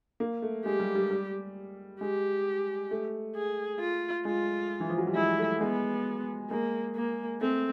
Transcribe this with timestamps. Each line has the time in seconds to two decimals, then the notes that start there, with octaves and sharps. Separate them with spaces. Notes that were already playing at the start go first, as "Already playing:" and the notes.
0.20 A#3
0.42 A3
0.65 G#3 G4
0.80 G3
0.95 G3
1.11 G3
2.00 G#3 G4
2.91 A3
3.36 G#4
3.80 F4
4.25 G#3 F4
4.80 E3
4.90 F3
4.98 F#3
5.07 G3
5.15 G#3 E4
5.39 A3
5.61 G#3 B3
6.50 G#3 A#3
6.96 A#3
7.41 A3 C4